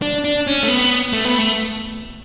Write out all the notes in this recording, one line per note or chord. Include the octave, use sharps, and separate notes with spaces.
D4
D4
C#4
A3
B3
A3
B3
A3